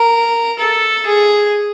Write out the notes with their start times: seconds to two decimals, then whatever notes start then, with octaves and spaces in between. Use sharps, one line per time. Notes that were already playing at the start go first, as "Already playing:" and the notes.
Already playing: A#4
0.59 A4
1.06 G#4